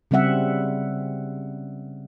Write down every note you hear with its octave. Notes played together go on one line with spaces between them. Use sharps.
C#3 G3 C4 E5 F#5